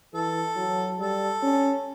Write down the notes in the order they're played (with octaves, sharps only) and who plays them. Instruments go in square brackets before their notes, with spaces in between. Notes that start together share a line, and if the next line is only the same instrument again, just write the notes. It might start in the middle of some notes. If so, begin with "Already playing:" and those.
[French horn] E3 [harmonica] A4
[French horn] F#3
[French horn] G3 [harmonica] A4
[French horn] C#4